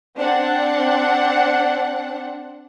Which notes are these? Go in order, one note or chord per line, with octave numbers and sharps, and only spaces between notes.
C4 D4 F#5